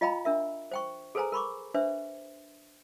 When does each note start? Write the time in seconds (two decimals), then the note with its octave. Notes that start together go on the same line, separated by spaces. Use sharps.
0.01 F4 D#5 F5 G5 A#5 B5
0.25 D4 A#4 E5
0.71 C5 G5 C#6
1.15 G#4 A4 B4 C5 G#5 A#5
1.32 A#4 B5 C#6 D6
1.74 D4 B4 C5 E5